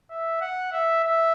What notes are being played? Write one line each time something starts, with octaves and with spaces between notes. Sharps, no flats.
E5
F#5
E5
E5